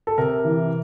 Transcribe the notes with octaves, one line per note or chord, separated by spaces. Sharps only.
A4
C3 A#4
E3